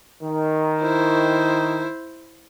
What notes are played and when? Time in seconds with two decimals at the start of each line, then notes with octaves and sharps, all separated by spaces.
0.23 D#3
0.82 E4 C5